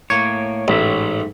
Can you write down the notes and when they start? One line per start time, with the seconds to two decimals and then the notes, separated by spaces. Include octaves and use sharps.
0.10 A2 A#3 C#5
0.68 A1 G#2 E5